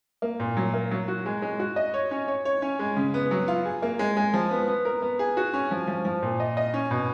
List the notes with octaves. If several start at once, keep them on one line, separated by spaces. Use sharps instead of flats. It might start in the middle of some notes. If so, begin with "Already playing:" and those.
A#3
A#2
F#3
A#3
F#3
F#4
G#3
G#3
F#4
D#5
C#5
C#4
C#5
C#5
C#4
G#3
C#3
B3
F#3
F4
G#4
A#3
G#3
G#3
F3
B3
B3
A#4
B3
G#4
F#4
C#4
F3
F3
F3
A#2
D#5
D#5
C#4
B2